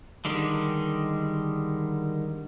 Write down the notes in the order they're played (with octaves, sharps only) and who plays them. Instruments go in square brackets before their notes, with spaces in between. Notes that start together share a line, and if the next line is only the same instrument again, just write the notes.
[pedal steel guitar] D3 D#3 G3 G#3